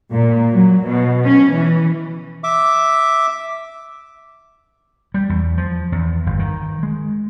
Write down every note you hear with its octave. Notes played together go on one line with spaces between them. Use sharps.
A#2
F#3
B2
C#4
E3
E5 D6
G3
E2
F3
E2
G1
D#3
G#3